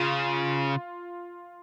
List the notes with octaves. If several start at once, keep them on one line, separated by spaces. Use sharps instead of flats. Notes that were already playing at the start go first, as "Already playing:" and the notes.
Already playing: C#3 F4